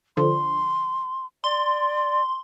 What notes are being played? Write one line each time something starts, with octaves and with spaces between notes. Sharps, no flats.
D3 F3 C6
D5 C6